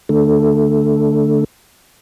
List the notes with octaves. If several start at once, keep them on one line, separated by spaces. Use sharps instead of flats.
D3 A3